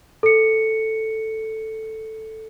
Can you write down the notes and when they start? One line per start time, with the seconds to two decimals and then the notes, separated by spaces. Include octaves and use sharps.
0.23 A4 C#7